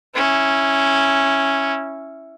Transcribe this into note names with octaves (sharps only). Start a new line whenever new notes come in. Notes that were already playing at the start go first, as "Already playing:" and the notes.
C#4 E4